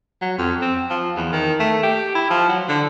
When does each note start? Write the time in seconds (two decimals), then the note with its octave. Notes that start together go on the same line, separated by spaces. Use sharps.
0.22 F#3
0.38 F2
0.62 C4
0.90 F3
1.16 E2
1.32 D#3
1.60 A3
1.83 G4
2.15 E4
2.31 F3
2.49 F#3
2.68 D3